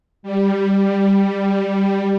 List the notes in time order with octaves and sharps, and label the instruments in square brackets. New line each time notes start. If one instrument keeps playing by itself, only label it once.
[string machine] G3